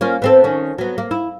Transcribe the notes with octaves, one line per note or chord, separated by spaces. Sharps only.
A#3 C#4 F4
B3 C4 A4
D#3 C#4
F#3 B3
A#3
E4